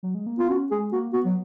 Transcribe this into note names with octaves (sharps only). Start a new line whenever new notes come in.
F#3
G#3
A#3
B3 F4
C#4 F#4
G#3 G#4
A#3 F#4
B3 F#4
F#3